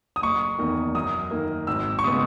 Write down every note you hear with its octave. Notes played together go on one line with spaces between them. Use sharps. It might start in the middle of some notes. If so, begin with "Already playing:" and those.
D#6
F#1 C#6
E2 D#3 A#3
F#2 D#6
D#3 A#3
G#1 E6
C#6
C#3 G#3 B3 D#6